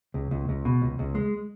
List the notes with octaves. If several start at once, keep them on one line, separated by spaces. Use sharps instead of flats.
C#2
C#2
C#2
B2
C#2
C#2
G#3